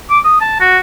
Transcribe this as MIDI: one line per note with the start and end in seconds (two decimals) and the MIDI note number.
0.10 0.19 86
0.25 0.40 87
0.41 0.57 81
0.60 0.79 66